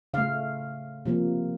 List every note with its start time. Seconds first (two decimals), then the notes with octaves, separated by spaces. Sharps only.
0.14 C#3 A3 F5
1.06 C3 F3 A#3